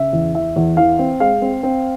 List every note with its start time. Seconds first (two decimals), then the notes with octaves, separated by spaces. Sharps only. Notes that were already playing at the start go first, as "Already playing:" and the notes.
Already playing: C#3 E5
0.13 E2
0.35 E3 E5
0.56 E2
0.77 E3 F5
0.99 C4
1.20 G#3 F5
1.42 C4
1.63 C4